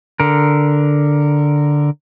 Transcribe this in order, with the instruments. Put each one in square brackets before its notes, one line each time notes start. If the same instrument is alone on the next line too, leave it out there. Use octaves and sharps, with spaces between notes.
[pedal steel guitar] D3 A#4